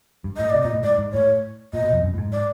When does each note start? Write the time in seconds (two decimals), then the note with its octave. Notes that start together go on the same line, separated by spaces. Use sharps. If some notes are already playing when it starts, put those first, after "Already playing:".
0.24 G2
0.37 A2 D#5
0.50 C3 D5
0.62 A#2 D#5
0.74 A2
0.84 G#2 D5
0.98 G#2
1.13 A2 C#5
1.73 A#2 D#5
1.84 B2
1.93 F2
2.03 F#2
2.14 A2
2.18 G#2
2.32 D5